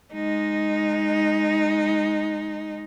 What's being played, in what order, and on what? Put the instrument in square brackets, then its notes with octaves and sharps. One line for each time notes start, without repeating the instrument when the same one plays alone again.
[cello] G#3 D#4